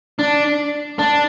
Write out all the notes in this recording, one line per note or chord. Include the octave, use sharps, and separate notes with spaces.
D4
D4